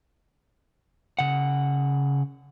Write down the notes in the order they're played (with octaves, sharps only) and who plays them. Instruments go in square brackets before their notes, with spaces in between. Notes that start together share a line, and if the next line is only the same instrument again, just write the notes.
[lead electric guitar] C#3 F#5